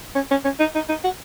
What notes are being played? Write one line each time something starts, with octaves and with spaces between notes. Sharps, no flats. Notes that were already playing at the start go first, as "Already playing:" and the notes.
C#4
C#4
C#4
D#4
D#4
D#4
F#4